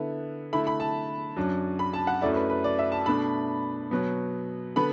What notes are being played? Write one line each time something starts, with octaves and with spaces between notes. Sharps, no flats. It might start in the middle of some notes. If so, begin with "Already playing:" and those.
Already playing: D3 B3 E4
D3 A3 E4 B5
B5
A5
F#2 F#3 D4
B5
A5
F#5
F#2 F#3 A3 E4 D5
B4
B4
D5
E5
A5
B2 A3 D4 B5
B2 F#3 B3
D3 B3 B5